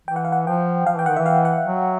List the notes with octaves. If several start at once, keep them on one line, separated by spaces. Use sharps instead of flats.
E3 G5
F#5
F5
F#5
F3 G5
F3 F5
E3 G5
D#3 F#5
E3 E5
F5
F#5
F#3